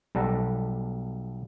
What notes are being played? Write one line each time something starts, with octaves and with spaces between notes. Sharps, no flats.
B1 G3 A4 F#5 A#5